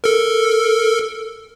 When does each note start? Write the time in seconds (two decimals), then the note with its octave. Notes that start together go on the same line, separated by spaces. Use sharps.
0.04 A4 A#4